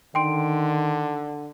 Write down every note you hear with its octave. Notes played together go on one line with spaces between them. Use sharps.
D3 D#3 G5 C6 D7